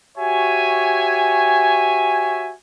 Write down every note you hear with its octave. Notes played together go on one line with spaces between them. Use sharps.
F#4 G4 C#5 E5 G#5